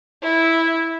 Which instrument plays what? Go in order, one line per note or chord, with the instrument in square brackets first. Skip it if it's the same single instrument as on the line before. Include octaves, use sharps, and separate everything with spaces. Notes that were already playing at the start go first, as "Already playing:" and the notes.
[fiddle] E4